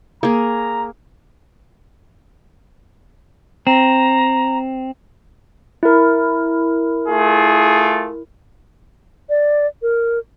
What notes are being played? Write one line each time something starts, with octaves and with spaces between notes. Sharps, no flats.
A#3 G#4 A#5
C4 A#5
E4 A#4
A3 F4 G#4
D5
A#4